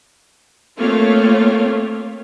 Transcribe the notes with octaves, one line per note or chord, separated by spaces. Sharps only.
A3 A#3 C4 F4 C#5 F5